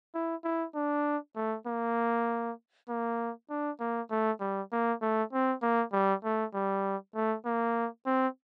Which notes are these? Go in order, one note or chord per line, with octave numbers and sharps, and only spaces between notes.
E4
E4
D4
A3
A#3
A#3
D4
A#3
A3
G3
A#3
A3
C4
A#3
G3
A3
G3
A3
A#3
C4